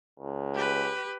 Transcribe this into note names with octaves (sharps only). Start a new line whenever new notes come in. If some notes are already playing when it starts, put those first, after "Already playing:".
C#2
G4 B4